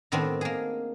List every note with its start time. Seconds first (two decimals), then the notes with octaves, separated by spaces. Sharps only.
0.12 A2 D#3 B3 C4 D4
0.41 A#3 G#4